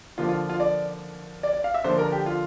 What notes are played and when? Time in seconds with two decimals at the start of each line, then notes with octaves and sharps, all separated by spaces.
0.18 D3 F3 A#3 F4
0.29 F4
0.49 F4
0.60 D5
1.43 D5
1.53 D5
1.64 F5
1.74 E5
1.84 D3 F3 A#3 C5
1.99 A#4
2.12 G4
2.26 F4